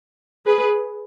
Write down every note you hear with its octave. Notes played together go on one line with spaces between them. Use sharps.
G#4 B4